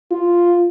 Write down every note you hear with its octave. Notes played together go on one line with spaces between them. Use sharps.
F4